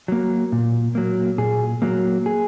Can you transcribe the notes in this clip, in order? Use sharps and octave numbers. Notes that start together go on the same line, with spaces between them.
F#3 A#3
A#2
F#3 A#3
A#2 G#4
F#3 A#3
G#4